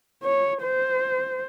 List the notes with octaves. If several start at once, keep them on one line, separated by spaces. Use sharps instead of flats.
C#5
C5